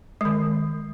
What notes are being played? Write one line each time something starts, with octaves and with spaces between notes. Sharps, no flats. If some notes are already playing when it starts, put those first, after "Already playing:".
D#3 G#3